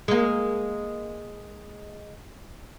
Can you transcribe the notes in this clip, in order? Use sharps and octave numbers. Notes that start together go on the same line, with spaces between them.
G#3 A#3